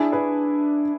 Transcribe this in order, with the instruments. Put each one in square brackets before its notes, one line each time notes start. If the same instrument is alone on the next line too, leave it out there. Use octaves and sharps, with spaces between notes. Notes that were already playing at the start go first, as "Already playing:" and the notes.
Already playing: [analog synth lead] D4 [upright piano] E4 G#4
[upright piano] G#4 B4